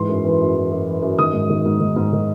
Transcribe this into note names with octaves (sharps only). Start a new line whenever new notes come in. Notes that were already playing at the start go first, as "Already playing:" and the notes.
Already playing: G#2 E3 C6
F#2
E3
F#2
E3
F#2
E3
F#2
D#3 D#6
G#2
D#3
G#2
D#3
G#2
D#3